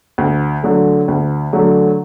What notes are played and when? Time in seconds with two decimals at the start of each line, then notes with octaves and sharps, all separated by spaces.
0.18 D2
0.63 D3 F#3 A3
1.08 D2
1.53 D3 F#3 A3